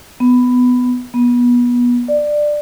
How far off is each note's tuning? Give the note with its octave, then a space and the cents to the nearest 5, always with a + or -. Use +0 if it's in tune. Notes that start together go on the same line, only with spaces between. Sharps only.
B3 +10
B3 -25
D5 +15